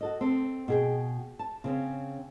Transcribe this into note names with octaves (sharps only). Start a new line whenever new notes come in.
F#4 A4 D#5
C4 A4
B2 G#4 G5
A5
C#3 C4 C#4